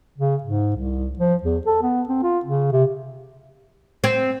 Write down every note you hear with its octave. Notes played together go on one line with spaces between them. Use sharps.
C#3
G#2
C2
F3
E2
A4
B3
C4
F4
C#3
C3
C4